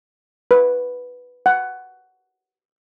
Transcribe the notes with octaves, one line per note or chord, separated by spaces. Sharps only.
B4
F#5